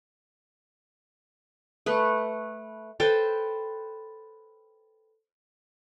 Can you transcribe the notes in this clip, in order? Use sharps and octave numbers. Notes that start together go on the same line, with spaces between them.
A3 B4
A4 B4 C5 G5